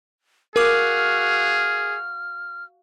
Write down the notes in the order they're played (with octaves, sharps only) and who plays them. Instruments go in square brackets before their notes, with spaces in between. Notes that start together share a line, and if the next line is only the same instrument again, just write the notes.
[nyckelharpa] F#4 F5 [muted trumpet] G#4 [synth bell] A#4 D6 [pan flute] F6